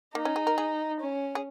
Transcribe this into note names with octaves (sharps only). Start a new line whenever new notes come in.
A#3 D#4
C#4
G#4
A#4
G#4
C#4
G#4